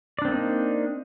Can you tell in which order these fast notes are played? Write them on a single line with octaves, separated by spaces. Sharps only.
D5 D4 C4 A#3 D#4